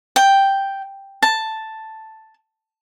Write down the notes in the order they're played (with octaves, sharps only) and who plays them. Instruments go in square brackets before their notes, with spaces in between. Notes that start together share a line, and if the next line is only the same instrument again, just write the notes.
[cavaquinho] G5
A5